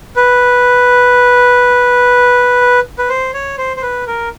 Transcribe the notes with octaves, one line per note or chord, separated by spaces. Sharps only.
B4
B4
C5
C#5
C5
C5
B4
A#4